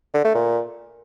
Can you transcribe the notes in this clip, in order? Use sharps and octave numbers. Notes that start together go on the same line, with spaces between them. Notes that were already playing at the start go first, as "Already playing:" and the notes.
D3
A3
A#2